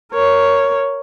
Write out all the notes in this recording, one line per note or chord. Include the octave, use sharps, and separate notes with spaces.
A#4 C#5